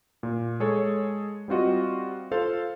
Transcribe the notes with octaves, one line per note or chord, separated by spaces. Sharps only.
A#2
G#3 G#4 A4 C#5
G3 C4 F4 F#4 D#5
F4 A4 C5 F5